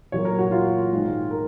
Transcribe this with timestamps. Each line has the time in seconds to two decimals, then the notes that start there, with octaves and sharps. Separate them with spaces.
0.12 A#2 F#3 A#3 C#5
0.25 A#4
0.39 F#4
0.51 F4
0.92 G#2 D#3 G#3
1.31 A#4